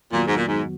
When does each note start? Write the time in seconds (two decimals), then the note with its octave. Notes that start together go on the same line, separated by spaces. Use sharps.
0.11 F2 A#2 D#3 F#3 B3 F#4
0.26 G#2
0.36 A#2
0.47 G#2